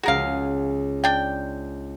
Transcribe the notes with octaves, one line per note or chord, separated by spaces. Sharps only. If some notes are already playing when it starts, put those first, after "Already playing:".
C#2 F#4 G#4 A#4 F5
D4 G5